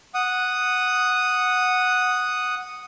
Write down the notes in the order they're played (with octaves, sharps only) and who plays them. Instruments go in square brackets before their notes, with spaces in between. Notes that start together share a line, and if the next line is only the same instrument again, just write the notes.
[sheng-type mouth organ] F#5 D#6